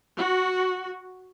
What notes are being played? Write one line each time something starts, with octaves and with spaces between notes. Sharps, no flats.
F#4